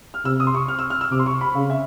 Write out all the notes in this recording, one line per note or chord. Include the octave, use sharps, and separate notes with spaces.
F6
C3 E6
D#6
C6
C#6
F6
E6
F6
E6
C3 D6
C6
C#6
B5
C#3 F5
E5